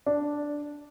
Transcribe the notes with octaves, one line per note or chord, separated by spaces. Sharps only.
D4